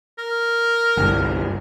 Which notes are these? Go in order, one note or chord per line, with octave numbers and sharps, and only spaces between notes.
A#4
G1 C2